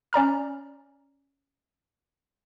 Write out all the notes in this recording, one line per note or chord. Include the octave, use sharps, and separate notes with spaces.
C#4 D5 A#5 F6